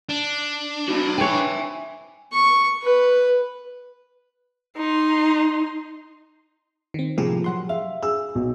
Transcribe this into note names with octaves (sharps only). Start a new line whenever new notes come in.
D4
D#4 F#4
C4 C#5 E5 G#5
C#6
B4
D#4 C6
D#3 C4
A2 C3 F3 A#3 G4 G#4
F#3 F#5 C6
E5 F5
G#4 E6
B1